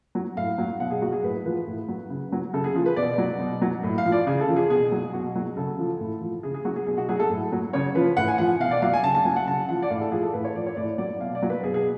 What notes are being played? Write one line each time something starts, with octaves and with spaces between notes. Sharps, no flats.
F#3
A2 F5
F#3
B2 F#5
G#4
F#3 F#4
G#4
A2 B4
F3 B4
A2
F#3
C#3
F#3
C#3 A4
G#4
F3 G#4
B4
B2 D5
F#3
B2
F#3
A2
F5
F3
D5
C#3 G#4
A4
F3
G#4
B2 G#4
F#3
B2 F#4
F#3
C#3 A4
F3
A2
F3
C#3 G#4
G#4
F#3 F#4
G#4
B2 G#4
F#4
F#3 G#4
A4
A2
F#3
C#3 C#5
F3 B4
A2 F#5
G#5
F3 F#5
B2 F5
D5
F#3 F5
G#5
C#3 A5
A5
F#3 G#5
F#5
C#3 A5
F3 F#5
D5
A2 F5
A4
F3 G#4
A4
A2 B4
C#5
F3 D5
C#5
A2 D5
F#3 D5
B2 F5
D5
F#3
B4
B2 G#4
G#4